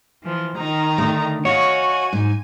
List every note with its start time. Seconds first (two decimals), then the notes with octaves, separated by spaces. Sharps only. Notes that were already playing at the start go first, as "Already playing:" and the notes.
0.22 E3 F3
0.56 D#3 D#4 A#5
0.98 D3 A3
1.45 F#4 C#5 D#5 F5 G#5
2.13 G#2 D#4